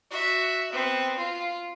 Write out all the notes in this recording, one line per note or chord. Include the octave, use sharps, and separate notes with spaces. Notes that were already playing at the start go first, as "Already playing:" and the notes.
F#4 E5
B3 C4
F4